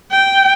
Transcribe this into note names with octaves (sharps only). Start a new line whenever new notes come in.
G5